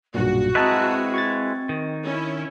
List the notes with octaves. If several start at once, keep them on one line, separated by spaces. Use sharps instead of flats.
B1 G2 A#2 F#4 G#4
G#3 C4 E4 B4 D#5 A5 A#5
C#6 G#6 A6
D#3
C#4 E4